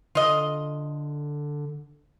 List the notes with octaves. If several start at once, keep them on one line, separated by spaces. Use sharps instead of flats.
D3 F4 D#5